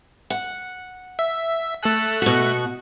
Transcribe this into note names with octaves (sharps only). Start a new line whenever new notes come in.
F#5
E5
A3 A4 F#6
B2 F#4 C#6